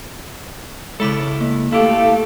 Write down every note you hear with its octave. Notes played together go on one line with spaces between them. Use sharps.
C#3 G#3 E4 A4 E5 D6
A#3
A3 E4 G4 A4 F5